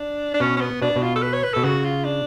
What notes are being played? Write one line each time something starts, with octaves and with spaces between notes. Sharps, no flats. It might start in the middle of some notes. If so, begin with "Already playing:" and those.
Already playing: D4
D4
B2 C#4
C#4
B3
B2 D4
B2
F4
A4
B4
C#5
B4
B2 A4
C#3 F#4
F4
D4